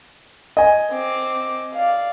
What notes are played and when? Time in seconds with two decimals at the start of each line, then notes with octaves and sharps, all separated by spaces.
0.57 D#5 G#5
0.91 C4 D6
1.74 D5 F5